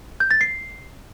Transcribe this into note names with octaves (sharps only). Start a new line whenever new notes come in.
G6
A6
C7